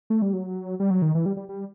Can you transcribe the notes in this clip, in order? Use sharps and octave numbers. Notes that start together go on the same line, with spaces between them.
A3
G3
F#3
G3
F#3
D#3
E3
G3
G3
G3